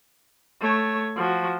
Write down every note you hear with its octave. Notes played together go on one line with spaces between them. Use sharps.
A3 C#5
F3 F#4